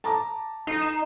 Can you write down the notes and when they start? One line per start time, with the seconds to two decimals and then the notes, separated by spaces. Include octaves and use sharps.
0.04 A5 A#5 D6
0.67 D#4 C7
0.82 E7